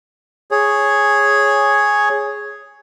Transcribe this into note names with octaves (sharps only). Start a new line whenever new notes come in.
G#4 C#5